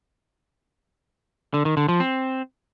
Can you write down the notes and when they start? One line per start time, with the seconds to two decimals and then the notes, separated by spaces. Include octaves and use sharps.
1.54 D3
1.65 D#3
1.77 D3
1.88 F3
2.00 C4